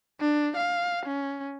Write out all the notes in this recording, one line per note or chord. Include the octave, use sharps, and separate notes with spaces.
D4
F5
C#4